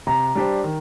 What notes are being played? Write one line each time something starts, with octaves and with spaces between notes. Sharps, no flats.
C3 A#5
G3 D4 G4 C5
D#3